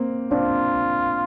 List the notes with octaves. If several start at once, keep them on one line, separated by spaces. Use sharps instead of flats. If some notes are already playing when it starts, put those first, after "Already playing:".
Already playing: A#3 C4
C4 D4 F4